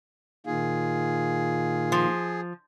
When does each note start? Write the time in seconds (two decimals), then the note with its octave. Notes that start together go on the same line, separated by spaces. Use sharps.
0.46 A#2 D#3 F4 G#4
1.92 F3